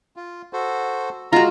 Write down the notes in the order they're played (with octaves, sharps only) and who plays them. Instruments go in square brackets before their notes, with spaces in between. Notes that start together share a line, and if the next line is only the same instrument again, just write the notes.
[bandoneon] F4
F#4 A4 C5
[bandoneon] G#3 [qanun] F4 F#4 [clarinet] A#5